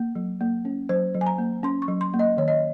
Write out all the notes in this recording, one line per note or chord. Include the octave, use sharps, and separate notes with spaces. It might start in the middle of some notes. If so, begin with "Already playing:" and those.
Already playing: A#3
F#3
A#3
C#4
F#3 C5
F#3
G#5
A#5
A#3
C#4 C6
C#6
F#3
C6
A#3
D#5
D#3 C#5
D#5